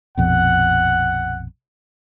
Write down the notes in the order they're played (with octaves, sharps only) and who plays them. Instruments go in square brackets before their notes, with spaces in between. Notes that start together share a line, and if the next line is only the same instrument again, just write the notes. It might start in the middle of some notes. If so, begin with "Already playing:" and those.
[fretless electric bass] A#1 F2 B2 [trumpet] F#5